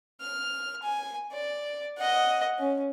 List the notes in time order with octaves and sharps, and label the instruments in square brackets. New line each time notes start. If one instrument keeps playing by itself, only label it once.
[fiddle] F6
G#5
D5
D#5 F#5
C#4